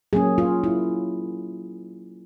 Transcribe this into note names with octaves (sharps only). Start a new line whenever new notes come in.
F#3 A#3 C#4 G#4
F4
E4